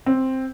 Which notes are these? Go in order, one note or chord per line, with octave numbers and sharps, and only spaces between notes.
C4